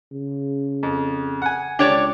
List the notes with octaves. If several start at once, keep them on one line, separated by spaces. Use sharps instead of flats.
C#3
F2
F#5 G#5
C#2 D4 G4 C#5 D5